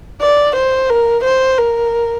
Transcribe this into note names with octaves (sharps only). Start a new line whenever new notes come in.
D5
C5
A#4
C5
A#4